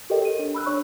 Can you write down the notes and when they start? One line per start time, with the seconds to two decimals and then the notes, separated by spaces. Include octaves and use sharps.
0.10 G4 A4 A#4 C#5 D#5 G5
0.25 D#7
0.39 D4
0.54 B5 E6 F#6
0.66 D4 C#5 C#6